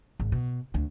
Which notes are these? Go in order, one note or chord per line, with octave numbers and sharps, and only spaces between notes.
G#1
B2
D2